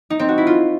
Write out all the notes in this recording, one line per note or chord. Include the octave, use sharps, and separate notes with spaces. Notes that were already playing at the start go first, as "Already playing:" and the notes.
D#4
C4
F#4
E4
F4